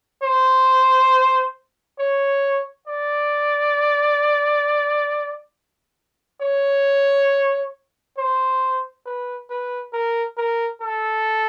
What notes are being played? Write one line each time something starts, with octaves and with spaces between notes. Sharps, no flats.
C5
C#5
D5
C#5
C5
B4
B4
A#4
A#4
A4